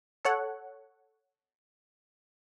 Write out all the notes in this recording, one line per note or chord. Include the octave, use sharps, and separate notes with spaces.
A4 C#5 F#5